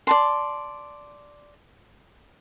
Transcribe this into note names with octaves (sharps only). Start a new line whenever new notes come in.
D5 A5 C6